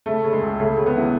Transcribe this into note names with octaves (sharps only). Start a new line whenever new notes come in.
C#3 A3
C#3
G#3
C#2
C#3 A3
C#3
B3
E3